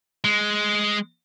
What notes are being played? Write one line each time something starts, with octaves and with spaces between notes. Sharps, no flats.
G#3